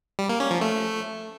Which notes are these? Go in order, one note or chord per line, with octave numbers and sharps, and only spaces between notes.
G3
A#3
C#4
F3
A3